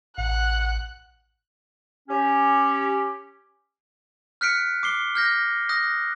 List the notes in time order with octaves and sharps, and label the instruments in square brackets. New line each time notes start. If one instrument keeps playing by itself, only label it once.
[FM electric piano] A1 [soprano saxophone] F#5 [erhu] F#6
[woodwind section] C#4 G4
[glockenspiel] F6 F#6 B6 C#7 D7
D6 C7 G7
F6 G6 A#6
D#6 F#6 A#6